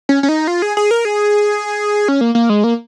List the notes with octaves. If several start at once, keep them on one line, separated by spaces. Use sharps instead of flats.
C#4
C#4
D#4
F4
G#4
G#4
A#4
G#4
C#4
A#3
A#3
G#3
A#3